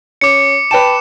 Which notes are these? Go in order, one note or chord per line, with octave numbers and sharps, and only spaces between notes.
C#4 D6 C#7
B4 G5 A5 E7